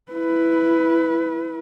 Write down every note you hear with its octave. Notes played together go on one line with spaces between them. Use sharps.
E4 B4